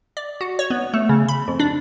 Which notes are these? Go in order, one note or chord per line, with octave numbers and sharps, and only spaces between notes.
D5
F#4
C#5
B3
A3
C#3
B5
F2
D4